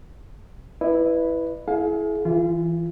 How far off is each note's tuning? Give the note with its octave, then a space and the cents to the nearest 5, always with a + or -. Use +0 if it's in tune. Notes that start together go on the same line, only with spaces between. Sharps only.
E4 +0 B4 +0 D5 +45
E4 +0 G#4 +35 F5 +35
E3 +5 F4 -30